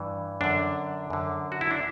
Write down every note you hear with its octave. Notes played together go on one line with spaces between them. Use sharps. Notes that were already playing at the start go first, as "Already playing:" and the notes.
Already playing: G2 E3
F#2 D3 D4
F#2 D3
F#4
E4
D4